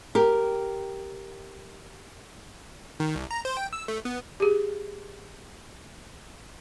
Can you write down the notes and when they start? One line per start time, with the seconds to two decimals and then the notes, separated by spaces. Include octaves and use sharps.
0.15 G4 A#4
3.00 D#3
3.15 C2
3.31 A#5
3.45 C5
3.57 G5
3.73 E6
3.88 A3
4.05 B3
4.40 G4 G#4